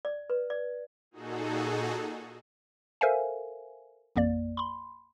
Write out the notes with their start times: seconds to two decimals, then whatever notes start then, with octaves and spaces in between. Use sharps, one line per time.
0.05 D5
0.30 B4
0.50 D5
1.11 A#2 D#4 F#4 G#4 A4
3.01 A4 A#4 C5 E5 F5 G#5
4.16 A1 F2 A#3 D5
4.57 B5 C6